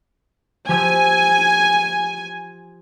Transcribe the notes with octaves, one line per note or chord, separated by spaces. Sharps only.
F3 G4 G#5 E6